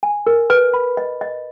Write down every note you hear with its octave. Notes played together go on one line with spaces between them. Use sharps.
G#5
A#4
B4
B5
D#5
D#5